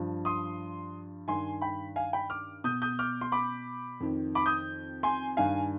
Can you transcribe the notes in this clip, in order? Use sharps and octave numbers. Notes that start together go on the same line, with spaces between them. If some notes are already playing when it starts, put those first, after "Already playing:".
Already playing: G2 F3
C6 D#6
G2 D#3 G#5 C6
G5 B5
F5 G#5
G5 B5
D6 F6
B2 D#6 G6
D#6 G6
D6 F6
C6
B5 D6
F2 D#3
B5 D6
D#6 G6
G#5 C6
G2 D#3 F5 G#5